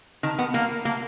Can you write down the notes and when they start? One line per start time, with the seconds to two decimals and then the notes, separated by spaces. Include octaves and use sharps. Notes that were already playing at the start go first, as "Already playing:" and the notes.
0.23 D#3
0.39 B3
0.54 A#3
0.85 A#3